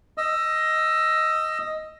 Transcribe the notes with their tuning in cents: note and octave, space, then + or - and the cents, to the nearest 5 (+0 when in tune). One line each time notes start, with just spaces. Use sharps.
D#5 +10 E6 +20